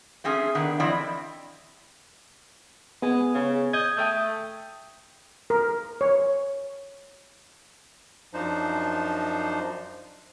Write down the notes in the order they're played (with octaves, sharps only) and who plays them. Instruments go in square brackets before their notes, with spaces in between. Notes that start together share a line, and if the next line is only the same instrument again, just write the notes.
[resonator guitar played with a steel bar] A3 C4 C#4 G#4
D#3 B3 D4
E3 F3 C4 E4 D5 D#5
[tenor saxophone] G#3 [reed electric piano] B3
[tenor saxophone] C#3
[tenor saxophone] D#5 [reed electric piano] G6 G#6
[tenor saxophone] A3 [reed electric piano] G5 D#6 G6
[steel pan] A#4
C#5
[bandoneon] F#2 F3 D4 D#4 C5